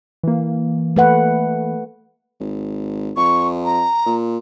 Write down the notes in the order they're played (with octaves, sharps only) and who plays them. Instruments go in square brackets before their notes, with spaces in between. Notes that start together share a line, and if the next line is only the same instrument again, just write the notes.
[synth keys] E3 A#3
[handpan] A3 B4 F#5
[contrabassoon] G#1
[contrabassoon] F2 [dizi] C#6
[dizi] A#5
[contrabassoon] A#2